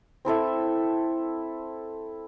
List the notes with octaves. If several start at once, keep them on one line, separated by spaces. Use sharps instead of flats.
C4 E4 A4 E5